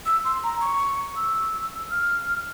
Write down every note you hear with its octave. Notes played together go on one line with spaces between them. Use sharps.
E6
C6
A#5
C#6
E6
F6